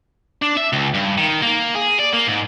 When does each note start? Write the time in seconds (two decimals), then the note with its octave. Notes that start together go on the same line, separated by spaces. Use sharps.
0.42 D4
0.57 E5
0.73 C#2
0.94 G2
1.18 D#3
1.42 A#3
1.75 G#4
2.00 D5
2.14 A#3
2.28 G#2